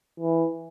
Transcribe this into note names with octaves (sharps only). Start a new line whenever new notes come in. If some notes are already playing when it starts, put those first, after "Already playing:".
E3